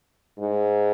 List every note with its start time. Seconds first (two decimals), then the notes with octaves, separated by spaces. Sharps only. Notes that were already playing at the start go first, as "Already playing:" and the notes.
0.39 G#2